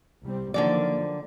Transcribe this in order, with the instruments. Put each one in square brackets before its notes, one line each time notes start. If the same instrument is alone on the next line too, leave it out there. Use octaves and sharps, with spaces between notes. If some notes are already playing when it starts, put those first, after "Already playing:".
[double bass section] C2 G3 C4
[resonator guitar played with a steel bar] D3 F#3 D5 [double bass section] D#3 F3 A#3